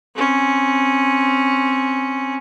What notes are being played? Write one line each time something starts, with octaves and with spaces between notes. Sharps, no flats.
C4 C#4